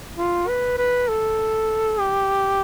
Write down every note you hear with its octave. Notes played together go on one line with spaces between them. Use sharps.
F4
B4
B4
A4
G4